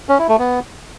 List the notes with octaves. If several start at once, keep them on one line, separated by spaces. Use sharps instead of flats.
C#4
E4
A3
B3